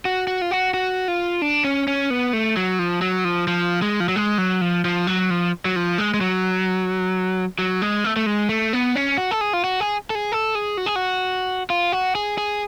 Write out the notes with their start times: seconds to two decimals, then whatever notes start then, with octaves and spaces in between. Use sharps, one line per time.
0.05 F#4
0.27 F#4
0.41 F4
0.51 F#4
0.74 F#4
1.08 F4
1.42 D4
1.64 C#4
1.88 C#4
2.10 B3
2.33 A3
2.56 F#3
2.79 F3
3.02 F#3
3.25 F3
3.48 F3
3.82 G#3
4.00 F3
4.08 F#3
4.16 G#3
4.38 F#3
4.61 F3
4.85 F3
5.07 F#3
5.30 F3
5.65 F#3
5.76 F3
5.98 G#3
6.14 G#3
6.21 F#3
7.59 F#3
7.82 G#3
8.04 A3
8.16 A3
8.26 G#3
8.49 A3
8.73 B3
8.96 C#4
9.18 F#4
9.31 A4
9.41 G#4
9.53 F4
9.64 F#4
9.80 G#4
10.10 A4
10.15 G#4
10.32 A4
10.55 G#4
10.77 F#4
10.86 G#4
10.96 F#4
11.70 F4
11.92 F#4
12.15 G#4
12.38 G#4